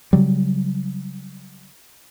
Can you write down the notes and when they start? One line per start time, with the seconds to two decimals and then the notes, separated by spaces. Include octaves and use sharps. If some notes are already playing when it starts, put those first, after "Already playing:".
0.13 C#3 F#3 G3